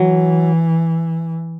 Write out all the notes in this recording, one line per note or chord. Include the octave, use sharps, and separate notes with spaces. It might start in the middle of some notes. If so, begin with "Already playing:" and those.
Already playing: E3 F#3